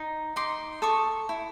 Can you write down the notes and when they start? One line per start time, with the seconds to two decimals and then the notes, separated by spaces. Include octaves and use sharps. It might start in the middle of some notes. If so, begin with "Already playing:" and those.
Already playing: D#4
0.36 D#4 C6 D6
0.82 A4 C#6 D#6
1.29 E4